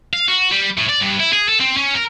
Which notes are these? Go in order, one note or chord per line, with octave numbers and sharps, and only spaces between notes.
F5
F#4
G3
A2
D5
G2
E4
G#4
A4
C4
C#4
A#4